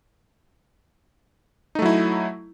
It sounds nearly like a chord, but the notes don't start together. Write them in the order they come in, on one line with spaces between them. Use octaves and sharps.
D#4 A3 F#3 E4